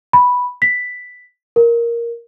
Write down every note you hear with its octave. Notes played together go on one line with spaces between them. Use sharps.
B5
B6
A#4